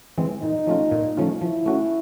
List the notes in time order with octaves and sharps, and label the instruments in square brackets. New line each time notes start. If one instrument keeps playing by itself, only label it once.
[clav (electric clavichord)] E3 G#3 C4
[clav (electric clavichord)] A#2 [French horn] D#4
[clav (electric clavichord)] F3 A3 C#4 F4
A#2
F3 A3 C#4 F4
[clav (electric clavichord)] F3 [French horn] E4
[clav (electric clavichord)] A3 C#4 F#4